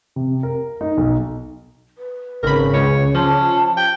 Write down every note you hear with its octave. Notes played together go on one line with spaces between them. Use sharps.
C3
A#4
D#4
B1
B4
G#1 C#3 A#4 B5
C#2 C#5
F3 C#4 A5
G5